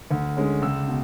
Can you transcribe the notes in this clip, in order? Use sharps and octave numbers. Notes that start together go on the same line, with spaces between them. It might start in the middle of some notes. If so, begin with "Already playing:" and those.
D2
D3 G#3 C#4
C#2 E6
B2